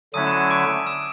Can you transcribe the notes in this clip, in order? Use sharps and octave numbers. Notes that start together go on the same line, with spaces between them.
D3 F#3 A3 C#4 E4 D#6 D#7
E7
D#6 D#7
D6 D7
E6 E7